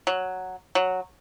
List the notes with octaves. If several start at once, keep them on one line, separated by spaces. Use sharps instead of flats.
F#3
F#3